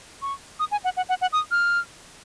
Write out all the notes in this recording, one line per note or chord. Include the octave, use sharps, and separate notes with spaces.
C#6
D#6
G#5
F#5
F#5
F#5
F#5
D#6
F6